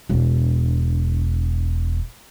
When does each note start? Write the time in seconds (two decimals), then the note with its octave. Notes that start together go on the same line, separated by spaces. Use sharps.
0.09 E1 D4